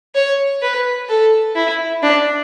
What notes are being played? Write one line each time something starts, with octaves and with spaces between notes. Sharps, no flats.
C#5
B4
A4
E4
D4